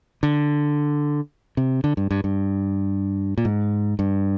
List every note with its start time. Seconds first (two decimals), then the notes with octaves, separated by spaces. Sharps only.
0.23 D3
1.57 C3
1.84 D3
1.97 G2
2.11 G2
2.24 G2
3.38 A#2
3.45 G#2
3.99 G2